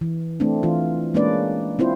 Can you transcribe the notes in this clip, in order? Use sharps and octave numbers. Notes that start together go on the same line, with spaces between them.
E3
A3 C4 D4
E3 F4
G#3 A#3 C#4 D4 B4 D5
C4 E4 F4 C5